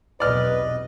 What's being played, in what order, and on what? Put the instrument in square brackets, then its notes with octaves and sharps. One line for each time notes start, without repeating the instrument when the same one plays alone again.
[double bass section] B1 E2 C3 [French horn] B4 [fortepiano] D5 F6 [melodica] D#5